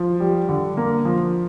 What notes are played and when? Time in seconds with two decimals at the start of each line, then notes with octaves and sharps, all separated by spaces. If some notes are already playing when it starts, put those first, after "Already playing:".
Already playing: F3
0.20 G3
0.49 D3
0.77 A#3
1.05 F3